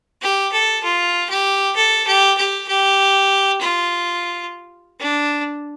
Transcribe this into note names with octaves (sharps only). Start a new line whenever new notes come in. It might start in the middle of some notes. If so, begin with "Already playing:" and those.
G4
A4
F4
G4
A4
G4
G4
G4
F4
D4